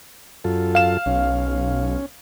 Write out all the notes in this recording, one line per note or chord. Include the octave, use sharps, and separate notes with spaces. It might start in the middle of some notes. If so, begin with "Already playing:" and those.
F#2 F4 A4
F5 E7
B1 C#4